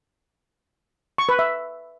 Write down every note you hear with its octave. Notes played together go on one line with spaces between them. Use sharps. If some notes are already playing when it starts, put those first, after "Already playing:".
C#6
B4
E5